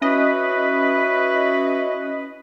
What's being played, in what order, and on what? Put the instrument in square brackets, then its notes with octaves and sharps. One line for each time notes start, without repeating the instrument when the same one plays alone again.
[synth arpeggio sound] C#4 D#5 [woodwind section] E4 F#4 B4